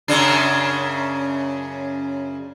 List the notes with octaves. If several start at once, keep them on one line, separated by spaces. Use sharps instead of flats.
F#2 C#3 D4